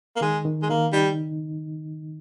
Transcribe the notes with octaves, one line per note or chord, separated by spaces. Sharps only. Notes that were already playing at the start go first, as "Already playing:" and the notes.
A#3
D#3 G#3
D#3
G#3
D#3 A#3
G3 D#4